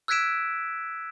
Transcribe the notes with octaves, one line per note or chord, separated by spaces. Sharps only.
E6 F#6 G#6 B6 D7 E7